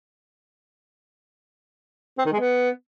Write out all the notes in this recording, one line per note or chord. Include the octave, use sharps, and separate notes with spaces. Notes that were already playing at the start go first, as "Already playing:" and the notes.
C4
D#3
G#3
B3